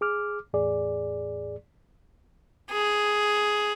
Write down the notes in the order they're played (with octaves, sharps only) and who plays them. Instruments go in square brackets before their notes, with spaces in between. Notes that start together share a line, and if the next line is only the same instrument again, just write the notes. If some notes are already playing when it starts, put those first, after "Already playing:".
[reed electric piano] G#4 D6 F6
E2 A2 G#4 D5
[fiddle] G#4